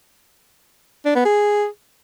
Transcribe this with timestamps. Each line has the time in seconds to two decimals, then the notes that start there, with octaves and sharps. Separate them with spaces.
1.06 D4
1.15 B3
1.25 G#4